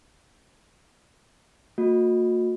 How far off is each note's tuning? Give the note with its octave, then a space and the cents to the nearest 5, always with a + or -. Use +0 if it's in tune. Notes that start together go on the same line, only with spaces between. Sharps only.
A#3 -40 F#4 -40